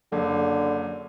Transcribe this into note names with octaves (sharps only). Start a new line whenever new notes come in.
F#1 D3